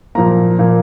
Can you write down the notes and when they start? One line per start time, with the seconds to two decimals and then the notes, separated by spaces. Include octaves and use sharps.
0.15 A#2 F3 A#3 A#5
0.59 A#2 F3 A#3